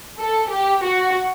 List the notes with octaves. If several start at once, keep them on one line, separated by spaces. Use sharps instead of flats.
A4
G4
F#4